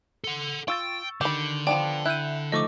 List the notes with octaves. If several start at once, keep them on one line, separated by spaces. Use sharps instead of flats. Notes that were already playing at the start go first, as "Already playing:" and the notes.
A4 F#5
F4 G5 C#6 E6 A6
D3 D#3 G4 B5
F3 B3 D4 G5
E4 E5 F#6 G6 D#7
F3 A3 D#4 D#5 C#6 D6